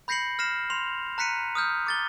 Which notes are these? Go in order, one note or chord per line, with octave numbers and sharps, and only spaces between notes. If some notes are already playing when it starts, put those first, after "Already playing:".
B5 G6 A#6 C7 C#7 F#7
F6 A#6 C7 E7
C6 F7
A#5 F#6 B6 C#7 D#7
D#6 F6 G6
D6 A6 G7